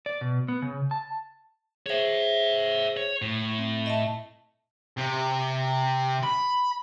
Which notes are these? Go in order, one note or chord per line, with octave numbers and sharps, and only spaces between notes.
D5
B2
B3
C#3
A5
G#4 C5 C#5 E5
C#5
A2
C4
D#5 E5 A5
C3
B5